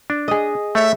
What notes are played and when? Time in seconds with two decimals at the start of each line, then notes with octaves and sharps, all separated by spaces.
0.10 D4
0.28 G#4 D#5
0.75 A3 C#5 E5